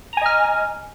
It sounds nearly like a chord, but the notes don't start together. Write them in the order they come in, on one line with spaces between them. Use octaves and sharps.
A#5 G#5 D#5 F6